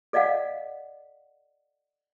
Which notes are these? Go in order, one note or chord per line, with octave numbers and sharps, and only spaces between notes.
A4 D5 D#5 F5 F#5